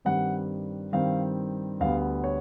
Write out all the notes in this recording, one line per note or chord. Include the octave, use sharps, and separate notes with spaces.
G2 D#3 G3 C4 F#5
G2 D#3 G3 C4 F5
D2 D3 G3 B3 F5
C#5